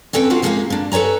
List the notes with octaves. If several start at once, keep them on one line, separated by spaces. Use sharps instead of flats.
C4 C#4 A4 B4 G5
D4 F4 F#4 F5
F3 G#3 A#3 C#4 E4 F5
A#3 D4
A4 B4 C#5 G#5 A#5